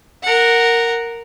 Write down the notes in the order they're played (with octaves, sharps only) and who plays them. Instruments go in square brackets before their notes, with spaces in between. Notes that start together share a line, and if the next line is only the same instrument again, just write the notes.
[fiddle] A#4 F#5